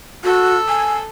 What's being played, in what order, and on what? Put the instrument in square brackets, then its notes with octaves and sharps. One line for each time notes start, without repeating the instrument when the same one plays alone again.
[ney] F#4 [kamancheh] A4 E6
[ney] G#5